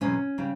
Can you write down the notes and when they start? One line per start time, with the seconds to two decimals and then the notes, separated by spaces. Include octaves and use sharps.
0.01 E2 B2 F#3 C#4
0.38 C#3 G3